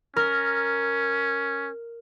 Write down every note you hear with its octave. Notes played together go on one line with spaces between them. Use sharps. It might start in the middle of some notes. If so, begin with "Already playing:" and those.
C#4 A#4